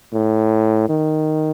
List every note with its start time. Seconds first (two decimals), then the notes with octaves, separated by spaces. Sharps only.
0.13 A2
0.89 D#3